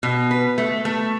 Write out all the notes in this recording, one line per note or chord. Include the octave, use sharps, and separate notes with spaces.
B2
B4
A3
A3